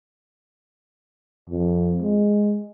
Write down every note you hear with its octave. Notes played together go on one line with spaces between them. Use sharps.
F2
G#3